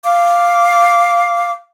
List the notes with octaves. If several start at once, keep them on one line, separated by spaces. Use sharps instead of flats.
F5 D6